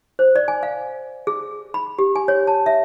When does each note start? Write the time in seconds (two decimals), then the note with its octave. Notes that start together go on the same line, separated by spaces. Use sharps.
0.19 C5
0.36 D5
0.48 G#5
0.63 F5
1.27 G#4
1.74 B5
1.99 G4
2.16 G#5
2.28 C#5
2.47 A5
2.66 E5